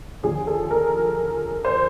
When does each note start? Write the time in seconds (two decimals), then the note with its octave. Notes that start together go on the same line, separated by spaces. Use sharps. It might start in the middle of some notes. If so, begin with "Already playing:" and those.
0.23 D#2 D3 F3 G#4
0.47 A4
0.71 A#4
1.65 C5